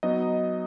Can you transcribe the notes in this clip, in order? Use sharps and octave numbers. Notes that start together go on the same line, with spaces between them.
F#3 B3 D#4 D#5